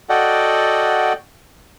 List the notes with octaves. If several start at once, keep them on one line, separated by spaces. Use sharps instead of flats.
F#4 A4 D5 D#5 F#5 G5